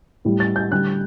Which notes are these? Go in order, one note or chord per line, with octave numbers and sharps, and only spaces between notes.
A2 G3
A6
G6
D3 G3 F#6